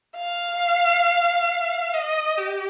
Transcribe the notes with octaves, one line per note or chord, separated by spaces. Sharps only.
F5
D#5
G4